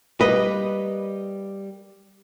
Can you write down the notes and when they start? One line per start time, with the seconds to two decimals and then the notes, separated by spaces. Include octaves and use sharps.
0.21 G3 A#3 B4 D#5